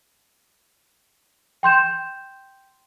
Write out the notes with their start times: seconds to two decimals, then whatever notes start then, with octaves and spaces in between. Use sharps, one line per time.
1.63 G5 C6 G6 E7